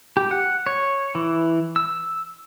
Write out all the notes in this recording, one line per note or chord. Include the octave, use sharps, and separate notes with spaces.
G4
F#5
C#5
E3
E6